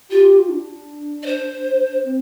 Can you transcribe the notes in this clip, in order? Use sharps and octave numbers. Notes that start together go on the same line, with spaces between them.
F4 G4
F4
D4
D5
C5
C4